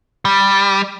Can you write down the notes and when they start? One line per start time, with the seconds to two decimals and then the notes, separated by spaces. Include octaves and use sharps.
0.25 G3